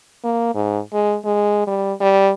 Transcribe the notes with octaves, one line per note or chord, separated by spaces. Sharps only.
A#3
G#2
G#3
G#3
G3
G3